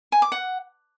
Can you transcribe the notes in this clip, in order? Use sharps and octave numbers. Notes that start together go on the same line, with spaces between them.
G#5
D6
F#5